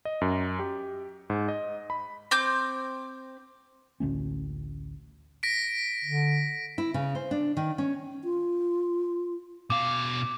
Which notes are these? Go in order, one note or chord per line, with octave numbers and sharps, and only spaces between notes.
D#5
F#2
G4
G#2
D#5
B5
C4 D6 G6
A1 D2 A3 C#4
A#6 B6 D7
D3
E4
C#3
C5
D4
D#3
C#4
F4
B2 F5 D6